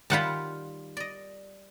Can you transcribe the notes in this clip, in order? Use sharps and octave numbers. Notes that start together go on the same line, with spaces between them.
D#3 G3 F4 F#5 A5 B5
D5 D#5